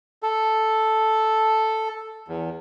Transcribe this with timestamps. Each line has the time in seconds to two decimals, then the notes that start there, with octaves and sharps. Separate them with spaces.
0.23 A4
2.28 E2